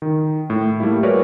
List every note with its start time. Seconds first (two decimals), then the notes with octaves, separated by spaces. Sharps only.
0.02 D#3
0.50 A2
0.80 G3 A3 A#3 E4
1.03 F#4 G#4 A#4 B4 C#5 D5